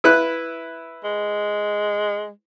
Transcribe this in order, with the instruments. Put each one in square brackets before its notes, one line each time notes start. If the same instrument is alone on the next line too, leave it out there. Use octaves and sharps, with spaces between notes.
[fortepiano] E4 B4 F#6
[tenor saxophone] G#3